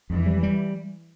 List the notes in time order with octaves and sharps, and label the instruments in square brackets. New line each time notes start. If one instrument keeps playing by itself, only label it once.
[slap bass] F2 [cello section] E3
[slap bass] G3
G3